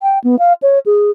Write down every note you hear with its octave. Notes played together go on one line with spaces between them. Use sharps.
G5
B3
F5
C#5
G#4